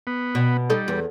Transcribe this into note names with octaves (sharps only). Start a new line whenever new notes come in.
B3
B2
G3 D#4 A4
E2